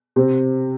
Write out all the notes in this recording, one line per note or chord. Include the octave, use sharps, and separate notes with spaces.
C3 C4